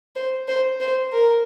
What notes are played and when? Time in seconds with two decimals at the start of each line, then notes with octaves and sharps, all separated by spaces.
0.16 C5
0.48 C5
0.80 C5
1.12 A#4